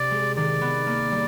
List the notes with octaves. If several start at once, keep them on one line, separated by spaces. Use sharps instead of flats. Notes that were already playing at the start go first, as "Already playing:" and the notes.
Already playing: C3 C4 D5
G#3
D#3 D5
B3
A#3
G3